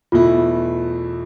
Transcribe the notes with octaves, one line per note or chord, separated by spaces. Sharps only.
E2 B2 A3 E4 F4